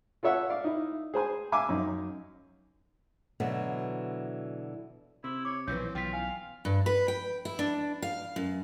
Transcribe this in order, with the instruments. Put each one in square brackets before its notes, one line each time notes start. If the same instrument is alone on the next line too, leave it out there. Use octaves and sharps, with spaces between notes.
[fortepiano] F4 A4 C#5 E5 F#5
D5 F5
D#4 E4
G#4 C5 G#5
E5 F5 G#5 D6
F#2 D#4
[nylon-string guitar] B2 D3 E3 F#3
[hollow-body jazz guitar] C3 [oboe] E4
[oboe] C#5 [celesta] D6
[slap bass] B1 A#2 [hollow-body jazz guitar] E3 F3 C#4 [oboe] C4 [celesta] B4 G6
[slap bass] B1 B2 [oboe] F4 [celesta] G5 B6
[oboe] F5 [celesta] G#5
[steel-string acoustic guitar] G2
B4
G5
E4
D4
F5
F#2